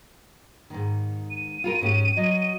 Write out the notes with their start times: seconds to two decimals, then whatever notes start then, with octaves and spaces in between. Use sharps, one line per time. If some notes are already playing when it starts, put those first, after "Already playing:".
0.70 G#2 D#3
1.31 D#7
1.64 F4 A4 A#4
1.81 G#2 C#4 G4
2.17 F#3 D#5